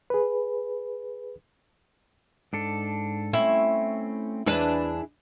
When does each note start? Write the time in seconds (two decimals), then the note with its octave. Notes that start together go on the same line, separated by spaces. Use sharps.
0.10 G#4 B4
2.53 G#2 D4 A4
3.33 A3 C4 C#4 E4
4.46 E2 D4 E4 G#4 B4 E5